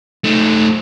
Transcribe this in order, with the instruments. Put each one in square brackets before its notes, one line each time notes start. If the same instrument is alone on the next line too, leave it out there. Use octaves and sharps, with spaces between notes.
[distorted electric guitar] A3 D#4